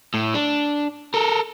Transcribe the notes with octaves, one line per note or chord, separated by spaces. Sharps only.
A2
D4
A4 A#4